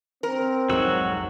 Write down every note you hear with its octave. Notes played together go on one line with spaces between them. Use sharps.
C4 A#4
B1 F2 G#2 F#3 F#4 E6